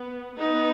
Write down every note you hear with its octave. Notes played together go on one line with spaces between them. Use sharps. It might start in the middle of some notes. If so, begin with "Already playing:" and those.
Already playing: B3
B3 D#4